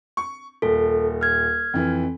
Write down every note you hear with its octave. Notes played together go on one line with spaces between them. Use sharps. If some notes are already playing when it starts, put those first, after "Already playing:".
C#6
D#1 A4
F6 G#6
F2 E3